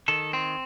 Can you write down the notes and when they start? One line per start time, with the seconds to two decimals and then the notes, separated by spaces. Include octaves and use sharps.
0.08 D#3 A4
0.33 C4